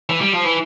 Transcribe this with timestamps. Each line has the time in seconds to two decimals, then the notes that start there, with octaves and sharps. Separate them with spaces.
0.09 E3
0.21 G3
0.33 F3
0.44 E3